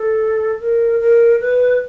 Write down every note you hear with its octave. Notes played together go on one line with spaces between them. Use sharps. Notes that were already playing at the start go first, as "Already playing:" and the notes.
Already playing: A4
A#4
A#4
B4